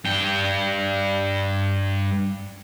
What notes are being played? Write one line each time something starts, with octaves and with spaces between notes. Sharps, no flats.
G2 G5